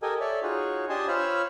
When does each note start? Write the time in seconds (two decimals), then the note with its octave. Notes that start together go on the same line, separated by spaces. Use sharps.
0.02 G4 A4 A#4 D#5 G#5
0.20 A4 C#5 D5 E5
0.43 D#4 F4 F#4 G#4 C#5
0.89 D4 G4 D#5 G#5 A5 C6
1.08 F4 C5 C#5 F5 B5 E6